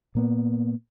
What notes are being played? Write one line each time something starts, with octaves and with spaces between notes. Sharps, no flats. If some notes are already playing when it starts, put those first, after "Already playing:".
A#2 A#3 B3